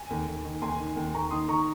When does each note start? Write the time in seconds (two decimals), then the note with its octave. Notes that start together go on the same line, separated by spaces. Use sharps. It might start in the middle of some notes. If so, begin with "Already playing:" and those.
Already playing: G#5
0.10 D#2
0.27 D#2
0.45 D#3
0.62 D#2 G#5 C6
0.79 D#3
0.96 D#2
1.14 D#2 A#5 C#6
1.30 D#3 C6 D#6
1.48 D#3 A#5 C#6